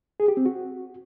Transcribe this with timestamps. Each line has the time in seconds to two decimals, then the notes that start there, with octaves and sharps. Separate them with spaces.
0.20 G#4
0.28 G4
0.37 C4
0.46 F#4